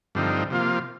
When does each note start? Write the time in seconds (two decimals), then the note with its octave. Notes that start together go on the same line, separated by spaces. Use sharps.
0.15 G2 D3 F3 C4 D#4
0.50 C3 F3 A#3 F4